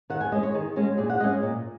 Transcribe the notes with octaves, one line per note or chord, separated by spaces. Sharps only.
D#3 F#5
G#5
G#3 C#4 D#5
C#5
D#3 G#4
G#3 C#4 F#4
A#2 G#4
F#5
G#3 C#4 D#5
A#2